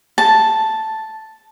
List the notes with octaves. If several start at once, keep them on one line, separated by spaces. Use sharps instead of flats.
A5